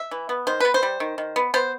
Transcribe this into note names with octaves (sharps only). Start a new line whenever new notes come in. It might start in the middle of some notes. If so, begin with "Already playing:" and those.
Already playing: E5
E3
B3
D#3 C5
B3 B4
C5
G3
D#3
D#3
B3
B3 C5